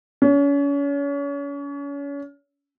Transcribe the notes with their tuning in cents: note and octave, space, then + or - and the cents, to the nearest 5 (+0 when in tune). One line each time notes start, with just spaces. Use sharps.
C#4 +35